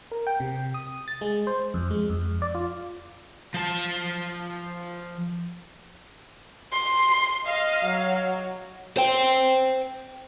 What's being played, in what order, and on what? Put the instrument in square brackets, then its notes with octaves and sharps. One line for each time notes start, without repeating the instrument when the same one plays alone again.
[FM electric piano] A#4
G5
C3
D#6
A6
G#3
C5
F2
G#3
F2
D5
F4
[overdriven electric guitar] F3 A5
[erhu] C6
[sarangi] D#5 [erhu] F5
[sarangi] F#3
[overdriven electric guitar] C5 G5